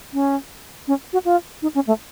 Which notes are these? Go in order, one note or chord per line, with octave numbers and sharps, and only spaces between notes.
C#4
C#4
F#4
F4
D#4
C#4
A3